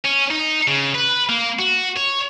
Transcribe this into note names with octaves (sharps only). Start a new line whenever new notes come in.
C#4
D#4
C#3
B4
A#3
F#4
C#5